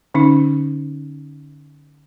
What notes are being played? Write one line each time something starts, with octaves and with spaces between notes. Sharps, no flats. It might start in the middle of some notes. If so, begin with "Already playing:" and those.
D3 C#4 D#4